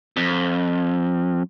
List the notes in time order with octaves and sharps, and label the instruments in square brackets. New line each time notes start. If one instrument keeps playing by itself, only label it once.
[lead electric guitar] F2